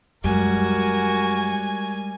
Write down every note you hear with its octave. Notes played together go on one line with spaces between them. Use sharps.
F#2 G3 G#3 F#4 A#4 G#5